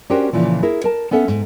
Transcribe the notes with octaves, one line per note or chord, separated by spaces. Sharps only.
C#4 D4 F#4 G4 A#4 C5
A#2 C#3 E3 F3
E4 G#4 A#4
A#4 A5
B3 C#4 A4 E5 F#5
G#2